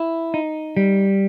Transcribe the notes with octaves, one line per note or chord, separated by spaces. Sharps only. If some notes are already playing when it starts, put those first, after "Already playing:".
Already playing: E4
D#4
G3